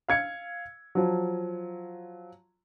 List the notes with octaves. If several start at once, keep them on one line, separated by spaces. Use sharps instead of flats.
F5 G#6 C#7
F3 F#3